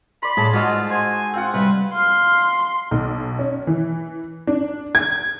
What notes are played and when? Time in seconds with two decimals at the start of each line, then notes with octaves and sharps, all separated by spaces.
0.22 D5 B5 C6
0.37 A2 G#4 A5
0.53 G#2 F4 F#4 D#5 E6
0.90 C5 G#5
1.34 C4 F4 F#5
1.54 C3 G3 B4
1.94 F5 C6
2.91 B1
3.39 C#4
3.67 E3
4.47 D4
4.95 G#6